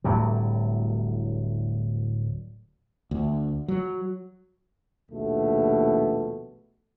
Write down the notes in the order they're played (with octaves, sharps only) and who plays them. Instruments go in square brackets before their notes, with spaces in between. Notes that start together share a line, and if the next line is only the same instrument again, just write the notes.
[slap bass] D1 A2 F#3 G3
[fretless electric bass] D2
F#3
[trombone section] A#1 D#2 B2 A3